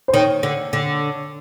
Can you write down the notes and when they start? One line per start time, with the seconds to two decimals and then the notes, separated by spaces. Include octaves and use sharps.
0.08 C5
0.13 D#3 C#5
0.43 D3
0.73 D3